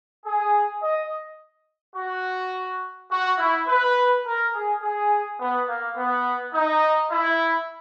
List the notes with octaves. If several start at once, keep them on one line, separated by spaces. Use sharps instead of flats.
G#4
D#5
F#4
F#4
E4
B4
A#4
G#4
G#4
B3
A#3
B3
D#4
E4